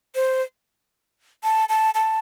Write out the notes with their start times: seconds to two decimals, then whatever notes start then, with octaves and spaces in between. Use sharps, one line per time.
0.15 C5
1.43 A5
1.69 A5
1.94 A5